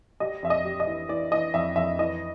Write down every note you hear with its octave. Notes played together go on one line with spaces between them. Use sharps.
G3 D#5
F2 E5
D#5
G3
D#5
E3
E3 D5
E3 D#5
F2 E5
F2 E5
E3 D#5